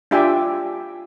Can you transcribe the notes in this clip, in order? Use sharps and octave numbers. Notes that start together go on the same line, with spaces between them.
D4 F4 G4 E5 G5 G#5